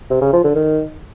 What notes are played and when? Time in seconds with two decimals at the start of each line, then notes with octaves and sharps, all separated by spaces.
0.10 C3
0.21 C#3
0.33 F3
0.44 D3
0.55 D#3